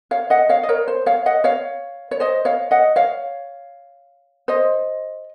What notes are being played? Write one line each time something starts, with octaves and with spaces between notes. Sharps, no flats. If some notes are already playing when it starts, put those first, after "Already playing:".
C#5 F5
D#5 F#5
C#5 F5
D#5
A#4 C#5
C5
C#5 F5
D#5 F#5
C#5 F5
C#5
C5 D#5
C#5 F5
D#5 F#5
C#5 F5
C5 D#5